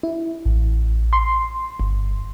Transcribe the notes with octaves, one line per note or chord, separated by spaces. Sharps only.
E4
A1
C6
G1